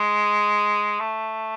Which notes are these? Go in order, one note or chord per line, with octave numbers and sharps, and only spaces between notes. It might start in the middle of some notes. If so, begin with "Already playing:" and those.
Already playing: G#3
A3